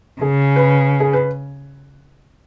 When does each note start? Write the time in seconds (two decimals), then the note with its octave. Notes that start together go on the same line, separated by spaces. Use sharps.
0.21 C#3 G#4
0.56 B4
1.00 G#4
1.13 B4